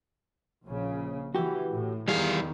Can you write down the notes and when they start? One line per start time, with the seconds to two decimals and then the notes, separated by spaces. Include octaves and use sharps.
0.64 A#1 C#3
1.35 E3 F#4 G4
1.72 A2
2.08 E2 D#3 E3 G3 G#4 F5